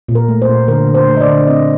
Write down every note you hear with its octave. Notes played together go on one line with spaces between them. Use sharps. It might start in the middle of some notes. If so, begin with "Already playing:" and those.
A#2
A#4
A3
C5
A#2
D3 A#4
D3
C5
A3
D#5
D5
D3
C4 D#5